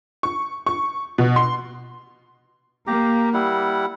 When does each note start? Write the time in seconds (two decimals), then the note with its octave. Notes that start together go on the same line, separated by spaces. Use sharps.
0.23 C#6
0.66 C#6
1.18 B2
1.36 C6
2.87 A#3 G4 A#5
3.34 G3 E4 F#5